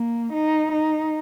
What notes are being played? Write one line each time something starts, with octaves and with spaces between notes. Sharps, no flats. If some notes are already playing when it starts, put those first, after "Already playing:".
Already playing: A#3
D#4
D#4